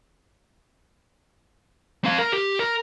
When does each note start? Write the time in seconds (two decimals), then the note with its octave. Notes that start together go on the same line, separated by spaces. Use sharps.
2.04 C4 F5
2.18 A#4
2.32 G4
2.59 A#4